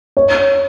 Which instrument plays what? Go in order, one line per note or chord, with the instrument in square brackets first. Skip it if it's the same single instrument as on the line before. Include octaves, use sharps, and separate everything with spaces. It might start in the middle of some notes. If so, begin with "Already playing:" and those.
[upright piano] C#5